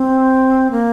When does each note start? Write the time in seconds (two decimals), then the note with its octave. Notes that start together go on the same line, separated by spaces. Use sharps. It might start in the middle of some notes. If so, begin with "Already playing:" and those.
Already playing: C4
0.71 A#3